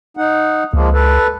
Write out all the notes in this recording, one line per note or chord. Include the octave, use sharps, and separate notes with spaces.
D#4 F#5
C#2 F3 G#3 A#3
A4 B4